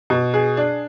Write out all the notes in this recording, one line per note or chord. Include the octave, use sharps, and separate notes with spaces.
B2
G#4
D4